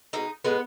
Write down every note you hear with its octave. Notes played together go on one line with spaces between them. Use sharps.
B2 G#3 D#4
A2 G#3 B3